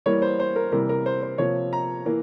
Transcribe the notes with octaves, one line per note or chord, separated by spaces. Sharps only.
E3 G3 A#3 C#5
C5
C5
A#4
C3 E3 G3 A#3 A#4
A#4
C5
C5
C3 F3 A#3 C#5
A#5
E3 A#3